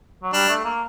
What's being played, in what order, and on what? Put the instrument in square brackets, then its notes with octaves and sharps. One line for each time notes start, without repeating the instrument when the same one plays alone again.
[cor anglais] F#3
[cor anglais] G3 [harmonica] D4
[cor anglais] A3
A#3